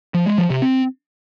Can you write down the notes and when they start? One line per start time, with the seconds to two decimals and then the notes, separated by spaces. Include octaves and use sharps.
0.14 F3
0.26 G#3
0.38 F3
0.50 C3
0.62 C4